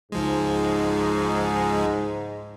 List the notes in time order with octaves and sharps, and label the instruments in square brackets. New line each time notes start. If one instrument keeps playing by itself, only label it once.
[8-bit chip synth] C#2 F3 G#3 [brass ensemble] G#2